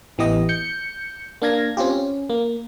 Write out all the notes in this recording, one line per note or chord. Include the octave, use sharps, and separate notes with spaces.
A1 E3 B3 G4 D#5
G6 C#7
A#3 D4 F5 G#6 A#6
C4 C#4 F4 G4
C#4
A#3